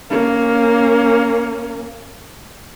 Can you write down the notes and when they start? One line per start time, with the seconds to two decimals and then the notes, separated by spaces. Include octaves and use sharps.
0.10 A#3 C#4